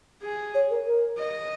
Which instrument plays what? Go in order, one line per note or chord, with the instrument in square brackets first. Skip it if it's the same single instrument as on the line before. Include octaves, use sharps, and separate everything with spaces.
[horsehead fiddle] G#4
[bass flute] C#5
A#4
A#4
[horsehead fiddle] D#5